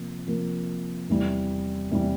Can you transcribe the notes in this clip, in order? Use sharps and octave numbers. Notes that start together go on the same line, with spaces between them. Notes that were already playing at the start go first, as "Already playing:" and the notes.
Already playing: C3 F3 A#3
C3 F3 A#3
E2 C3 E3 G3
E2 C3 E3 G3